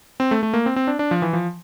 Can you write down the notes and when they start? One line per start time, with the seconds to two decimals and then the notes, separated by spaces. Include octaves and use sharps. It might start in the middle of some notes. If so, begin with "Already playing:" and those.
0.20 C4
0.31 A3
0.43 A3
0.54 A#3
0.66 C4
0.76 C4
0.87 D4
0.99 D4
1.11 F3
1.22 E3
1.33 F3